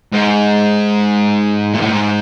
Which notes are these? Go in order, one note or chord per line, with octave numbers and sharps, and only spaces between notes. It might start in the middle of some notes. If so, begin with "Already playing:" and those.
G#2
A#2
A2
G#2